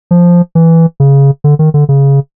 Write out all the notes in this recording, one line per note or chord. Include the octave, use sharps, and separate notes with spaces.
F3
E3
C#3
D3
D#3
D3
C#3